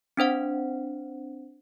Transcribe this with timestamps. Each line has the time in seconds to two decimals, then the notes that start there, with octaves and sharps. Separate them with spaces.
0.17 C4 D4 C5 F#5